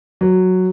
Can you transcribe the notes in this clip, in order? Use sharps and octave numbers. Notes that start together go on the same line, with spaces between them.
F#3